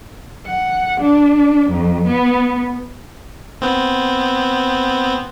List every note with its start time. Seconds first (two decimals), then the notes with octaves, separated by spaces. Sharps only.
0.46 F#5
1.00 D4
1.70 F2
2.06 B3
3.62 B3 C4